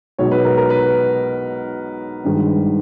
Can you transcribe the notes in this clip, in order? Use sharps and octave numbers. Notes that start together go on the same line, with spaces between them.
B1 B2 G#3 C#5
B4
A#4
A#4
B4
G#1 G2 D#3 G#3